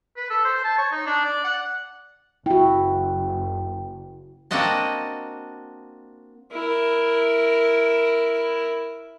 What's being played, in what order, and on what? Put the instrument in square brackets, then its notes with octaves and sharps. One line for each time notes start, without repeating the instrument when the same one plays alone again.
[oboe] B4
A4
C5
A5
C#5
D#4
D4
D5
F#5
[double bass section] F#1 [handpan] E4 F#4 [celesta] G5
[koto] A#3 C4 D4 F#4 D#5 A5
[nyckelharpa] E4 A#4